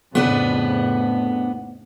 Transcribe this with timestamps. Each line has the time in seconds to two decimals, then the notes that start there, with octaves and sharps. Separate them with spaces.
0.15 F2 A2 C#3 B3 D4 B4